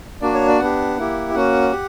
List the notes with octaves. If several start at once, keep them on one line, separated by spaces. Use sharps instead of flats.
A#3 D4 F#4 D5
C#5
D5
B3 D4 G4 F#5
A#3 E4 G4
A#3 C#4 F#4 F#5
G4